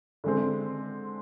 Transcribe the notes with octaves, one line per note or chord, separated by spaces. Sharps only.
D3 G#3 C4